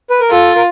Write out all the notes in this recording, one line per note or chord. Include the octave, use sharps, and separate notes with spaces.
B4
A#4
F4 A4
A#4